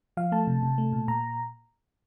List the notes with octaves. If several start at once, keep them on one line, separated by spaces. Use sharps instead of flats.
F3 F5
A3 A5
C3
C3
A3
A#2
A#2 A#5